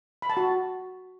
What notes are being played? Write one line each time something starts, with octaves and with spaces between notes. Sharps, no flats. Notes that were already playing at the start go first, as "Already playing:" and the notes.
B5
A5
F#4